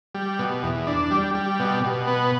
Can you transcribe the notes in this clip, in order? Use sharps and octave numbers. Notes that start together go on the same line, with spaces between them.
G3
B2
E2
D4
G3
G3
B2
B2
B3